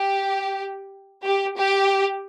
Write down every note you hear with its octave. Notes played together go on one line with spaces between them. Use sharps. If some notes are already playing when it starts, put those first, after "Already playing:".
Already playing: G4
G4
G4